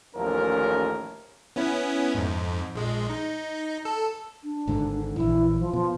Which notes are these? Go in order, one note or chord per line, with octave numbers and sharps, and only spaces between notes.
A1 D#2 F3 A3 C#4 A#4
B3 C#4 E4
F2 G#2
A#1 G#3
D#4
A4
D4
G#1 G#2 D3
A#1 E3 E4
F3
B2 F3